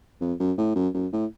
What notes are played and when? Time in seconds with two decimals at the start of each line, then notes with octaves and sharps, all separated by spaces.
0.21 F2
0.40 F#2
0.58 A2
0.75 F#2
0.94 F#2
1.13 A2